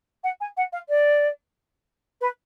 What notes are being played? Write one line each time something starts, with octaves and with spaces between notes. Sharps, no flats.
F#5
G#5
F#5
F5
D5
B4